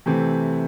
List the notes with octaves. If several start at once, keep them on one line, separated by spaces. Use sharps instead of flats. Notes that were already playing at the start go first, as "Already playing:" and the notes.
C3 E3 A3 C4